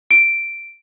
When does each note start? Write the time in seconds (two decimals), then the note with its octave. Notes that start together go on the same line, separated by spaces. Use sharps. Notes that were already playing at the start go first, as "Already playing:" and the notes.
0.11 D7